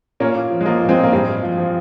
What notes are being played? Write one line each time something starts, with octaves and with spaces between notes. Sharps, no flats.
A#2 A#3 C#4
A#2
F3
G#3
F3 A#3
A#2
G#3 C4
A#2
A#3
G2 G#3 C4
G2
F3
F3